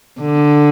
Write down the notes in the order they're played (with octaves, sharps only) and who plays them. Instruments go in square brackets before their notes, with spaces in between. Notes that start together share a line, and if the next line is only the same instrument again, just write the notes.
[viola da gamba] D3